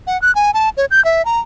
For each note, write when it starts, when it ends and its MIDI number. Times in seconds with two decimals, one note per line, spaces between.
0.07 0.20 78
0.22 0.34 90
0.35 0.51 80
0.54 0.69 81
0.77 0.85 73
0.91 1.03 91
1.05 1.24 76
1.25 1.40 82